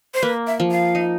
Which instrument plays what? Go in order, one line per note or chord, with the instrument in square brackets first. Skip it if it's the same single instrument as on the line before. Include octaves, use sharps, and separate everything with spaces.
[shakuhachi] C5
[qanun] A#3 [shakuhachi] B4
[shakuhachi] E5
[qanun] F3
[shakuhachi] F5
[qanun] D#4